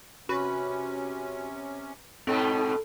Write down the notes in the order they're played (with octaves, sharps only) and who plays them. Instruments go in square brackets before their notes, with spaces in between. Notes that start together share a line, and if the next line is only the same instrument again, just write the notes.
[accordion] C3 C#4 [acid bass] F#4 [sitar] B4
[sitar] G#2 B2 D#4 [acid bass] C4 [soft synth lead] A4